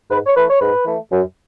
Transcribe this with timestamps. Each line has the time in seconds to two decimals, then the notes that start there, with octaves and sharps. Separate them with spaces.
0.10 G#2 B4
0.26 C#5
0.36 E3 A3 B4
0.49 C#5
0.61 G#2 B4
0.86 E3 A3
1.11 F#2